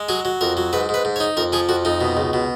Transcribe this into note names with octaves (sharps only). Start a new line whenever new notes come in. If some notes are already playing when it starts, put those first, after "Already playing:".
Already playing: G#3
F#3 G#4
F#3
F2 A#4
F#3
G#2 B4
G#2 B4
G#2
C#5
D#4
F2 A#4
F3 G#4
F2 F#4
F2 D#4
B2
C#2
B2